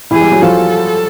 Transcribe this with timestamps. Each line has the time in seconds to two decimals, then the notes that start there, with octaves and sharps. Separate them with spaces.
0.11 E3 E4 G#4
0.21 G3 G4
0.32 F#3 F#4
0.42 F3 F4 A4